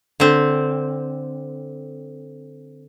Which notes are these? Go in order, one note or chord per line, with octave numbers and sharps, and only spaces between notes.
D3 C4